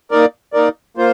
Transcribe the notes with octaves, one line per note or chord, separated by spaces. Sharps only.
A#3 D#4 A#4 D5
A#3 D#4 A#4 D5
A#3 F4 C5